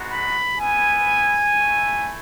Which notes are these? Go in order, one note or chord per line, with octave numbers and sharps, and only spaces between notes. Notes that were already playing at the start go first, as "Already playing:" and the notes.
Already playing: G#3 B3 D#4 F#4
B5
B3 E4 G#5
A3 E4